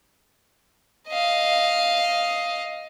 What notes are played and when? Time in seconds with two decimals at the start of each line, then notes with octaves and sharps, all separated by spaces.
1.08 D#5 F5